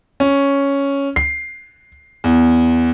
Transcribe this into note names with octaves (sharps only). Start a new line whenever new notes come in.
C#4
C7
E2